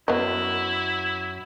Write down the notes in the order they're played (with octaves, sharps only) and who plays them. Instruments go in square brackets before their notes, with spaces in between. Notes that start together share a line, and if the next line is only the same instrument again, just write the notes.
[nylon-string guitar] F#2 [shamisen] B3 D#5 [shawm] E4